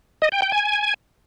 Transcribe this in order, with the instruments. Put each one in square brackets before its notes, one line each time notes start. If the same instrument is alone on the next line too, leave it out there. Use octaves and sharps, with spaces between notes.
[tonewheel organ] D#5
G5
G5
G#5